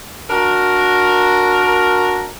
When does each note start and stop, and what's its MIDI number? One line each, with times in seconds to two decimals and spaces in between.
0.29 2.29 62
0.29 2.29 66
0.29 2.29 70